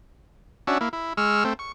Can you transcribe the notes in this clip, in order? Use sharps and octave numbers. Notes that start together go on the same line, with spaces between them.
C#4 D4 F#4 E5
A#3 E4
E4
G#3 C#6 E6 F6
A3 C4
C#6